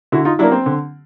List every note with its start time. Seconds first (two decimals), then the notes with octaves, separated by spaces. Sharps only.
0.12 D3 E4 F#4
0.25 D#4 F4
0.39 F#3 D4 E4
0.43 A#3
0.52 C4
0.66 D3